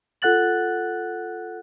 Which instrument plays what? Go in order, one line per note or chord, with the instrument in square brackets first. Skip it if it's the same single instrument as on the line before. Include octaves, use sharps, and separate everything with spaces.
[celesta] F4 A4 F#5 F#6 A6 F#7